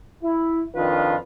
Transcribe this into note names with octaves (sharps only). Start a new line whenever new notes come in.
E4
F2 D#3 D4 F4 B4